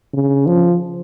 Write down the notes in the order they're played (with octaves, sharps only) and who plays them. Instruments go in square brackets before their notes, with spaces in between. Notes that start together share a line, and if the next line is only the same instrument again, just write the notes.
[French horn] C#3
F3